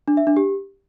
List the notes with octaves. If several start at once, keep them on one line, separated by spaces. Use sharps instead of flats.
D4
E5
D4
G4